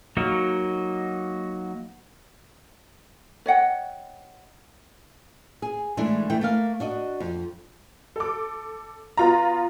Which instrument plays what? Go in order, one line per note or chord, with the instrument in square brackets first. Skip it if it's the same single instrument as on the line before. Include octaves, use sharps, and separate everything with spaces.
[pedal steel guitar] F#3 A#3 D#4 F#4
[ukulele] C#5 D#5 F#5 G5
[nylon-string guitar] G#4
E3 G#3 A3 D4
E3 A3 G5
A3 A#3 F5
D4 F#4 D#5
F2
[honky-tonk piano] A4 D6
B3 F4 A#5